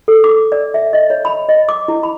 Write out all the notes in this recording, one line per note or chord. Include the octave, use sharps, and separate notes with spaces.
A4
D6
D5
E5
D#5
C#5
B5
D#5
D6
E4
B5